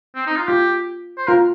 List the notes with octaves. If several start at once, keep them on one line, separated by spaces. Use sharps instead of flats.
C4
D#4
F4
F4 G4
C5
F4 A#4